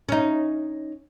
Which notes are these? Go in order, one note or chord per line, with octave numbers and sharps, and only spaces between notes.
C#4 D#4